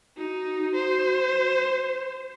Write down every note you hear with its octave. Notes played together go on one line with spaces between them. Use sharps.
D#4 F#4
C5